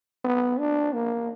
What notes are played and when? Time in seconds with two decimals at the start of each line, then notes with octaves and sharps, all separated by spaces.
0.24 B3
0.59 D4
0.93 A#3